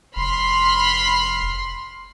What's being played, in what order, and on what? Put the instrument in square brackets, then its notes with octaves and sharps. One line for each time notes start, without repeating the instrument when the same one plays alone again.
[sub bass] F1 [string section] B5 C6 F6